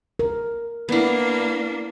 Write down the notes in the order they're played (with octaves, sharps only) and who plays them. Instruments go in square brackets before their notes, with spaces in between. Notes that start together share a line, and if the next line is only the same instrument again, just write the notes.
[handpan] A#4
[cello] A#3 D4 [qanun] B3 E4